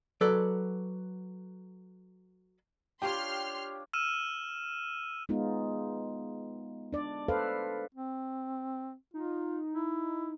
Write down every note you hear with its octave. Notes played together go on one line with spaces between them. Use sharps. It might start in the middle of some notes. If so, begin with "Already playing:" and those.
F#3 A4 B4 D5
D4 F4 G4 C#5 C6 F6
E6 F6 D#7 E7
G#3 B3 D#4 F4
D4 D5
A4 B4 C5 F5
C4
D#4 F4
E4